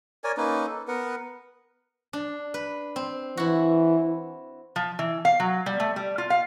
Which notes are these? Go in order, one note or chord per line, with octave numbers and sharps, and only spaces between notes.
A#4 C#5 D5 G#5
A#3 C#4 D#4 B4
A4
B3 A#4 B4 F#5
D4
B4
C4
E3 E4 F#4
F3
E3
F5
F#3
G3
A3
G3
F4
F5